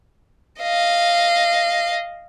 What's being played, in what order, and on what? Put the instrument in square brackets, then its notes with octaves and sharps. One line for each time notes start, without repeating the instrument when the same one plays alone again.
[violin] D#5 F5